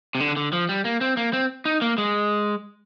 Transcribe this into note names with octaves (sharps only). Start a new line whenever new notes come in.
C3
D3
D3
F3
G3
A#3
C4
A#3
C4
D#4
A#3
G#3